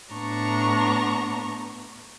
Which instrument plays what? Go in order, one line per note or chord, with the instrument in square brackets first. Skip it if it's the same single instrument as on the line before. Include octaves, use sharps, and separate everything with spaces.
[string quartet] A2 B3 D4 A#5 C#6